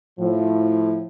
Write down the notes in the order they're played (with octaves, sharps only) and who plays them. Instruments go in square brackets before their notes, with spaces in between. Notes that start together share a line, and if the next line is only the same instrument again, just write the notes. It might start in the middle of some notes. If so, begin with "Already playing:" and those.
[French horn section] A2 F3